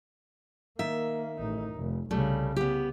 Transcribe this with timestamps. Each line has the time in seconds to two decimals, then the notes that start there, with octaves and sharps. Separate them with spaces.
0.79 D#3 A#3 E5
1.39 A1 D#4
1.76 F1
2.11 C2 C#3 G3 A3
2.56 B3 G4